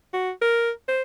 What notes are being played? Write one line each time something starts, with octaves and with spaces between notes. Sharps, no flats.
F#4
A#4
C5